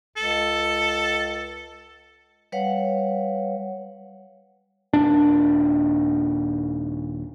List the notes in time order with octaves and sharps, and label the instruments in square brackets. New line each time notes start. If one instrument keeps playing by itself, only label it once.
[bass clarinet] C#2 [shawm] A4
[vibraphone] G3 B4 C#5 F5 F#5
[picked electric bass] D#1 D4